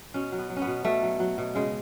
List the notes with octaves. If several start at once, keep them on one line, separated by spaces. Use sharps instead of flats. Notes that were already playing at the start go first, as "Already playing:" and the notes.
B2 C#4
F#3
B3
F#3
C#4
B3
B2
B2 A3
F#3
F#3
B2
C#3 G#3